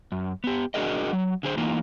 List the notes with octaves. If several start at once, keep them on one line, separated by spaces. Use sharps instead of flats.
F#2
B3 G4
D4 F#4 G#4 A#4 D#5
F#3
D3 G#4 C5
E3 A#3 D#4 F4